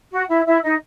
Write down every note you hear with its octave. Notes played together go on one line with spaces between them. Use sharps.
F#4 F#5
E4 E5
E4 E5
D#4 D#5